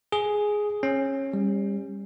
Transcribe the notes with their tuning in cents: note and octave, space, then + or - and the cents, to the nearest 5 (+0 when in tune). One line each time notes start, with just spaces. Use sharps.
G#4 +5
C#4 -25
G3 +25